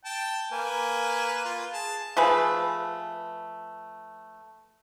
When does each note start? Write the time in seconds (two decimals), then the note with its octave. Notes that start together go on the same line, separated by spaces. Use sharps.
0.05 G5 A5
0.52 A#3 B4 G#5
1.45 F4
1.73 G#4 A5
2.17 F3 A3 G#4 B4